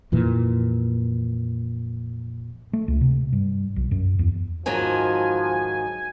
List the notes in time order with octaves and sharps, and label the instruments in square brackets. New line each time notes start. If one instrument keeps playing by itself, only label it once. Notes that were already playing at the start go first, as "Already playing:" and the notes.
[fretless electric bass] F2 A#2 E3
[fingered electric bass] A3
C#2
C3
G2
B1
F#2
E2
[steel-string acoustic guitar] G#2 D#3 F#3 [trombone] F3 [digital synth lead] G#5